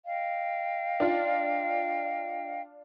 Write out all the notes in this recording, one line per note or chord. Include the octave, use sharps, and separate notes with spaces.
D#5 F5 G5
D4 F4